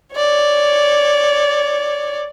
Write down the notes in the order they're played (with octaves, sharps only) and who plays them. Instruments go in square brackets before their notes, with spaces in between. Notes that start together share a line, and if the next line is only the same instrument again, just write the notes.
[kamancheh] C#5 D5